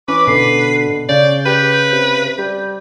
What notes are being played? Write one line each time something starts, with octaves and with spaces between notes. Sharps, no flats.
E3 C#4 B4 D6
B2 D3 C7
C#3 C#4 D5 G6
G4 B4
C3
G3 G6